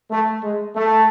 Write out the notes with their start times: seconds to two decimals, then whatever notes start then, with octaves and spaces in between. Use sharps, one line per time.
0.11 A3
0.43 G#3
0.76 A3